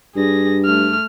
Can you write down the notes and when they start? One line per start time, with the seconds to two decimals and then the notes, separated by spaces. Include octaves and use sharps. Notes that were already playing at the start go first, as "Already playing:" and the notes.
0.16 G2 G#4 A#6
0.66 A3 F6